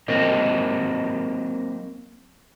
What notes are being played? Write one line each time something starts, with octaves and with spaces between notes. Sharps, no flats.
F#3 A#3 C4 A#4 C5 D#5